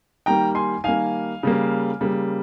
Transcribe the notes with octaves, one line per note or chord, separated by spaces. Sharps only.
D#3 G3 A#3 G5 A#5
G#5 C6
D#3 G3 A#3 F5 G#5
C#3 G3 A#3
C#3 G3 A#3